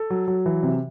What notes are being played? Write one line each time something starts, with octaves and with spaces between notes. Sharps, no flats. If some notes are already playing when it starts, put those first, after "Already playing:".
Already playing: A4
F#3
F#3
E3
C3